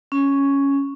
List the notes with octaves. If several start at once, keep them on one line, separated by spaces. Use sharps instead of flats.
C#4